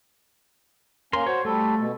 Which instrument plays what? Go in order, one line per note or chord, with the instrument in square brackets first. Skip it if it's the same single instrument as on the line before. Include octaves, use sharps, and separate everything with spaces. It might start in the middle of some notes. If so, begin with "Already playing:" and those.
[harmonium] A#3 C#4 [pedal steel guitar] A#4 C6
[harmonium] F#4 C5 [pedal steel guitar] C#5
[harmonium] G3 A4 [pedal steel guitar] A3
[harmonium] B2